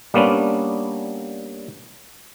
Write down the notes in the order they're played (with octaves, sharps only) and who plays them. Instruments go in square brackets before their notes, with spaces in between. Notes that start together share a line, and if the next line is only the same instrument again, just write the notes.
[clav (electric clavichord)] G3 A#3 B3 C#4 D4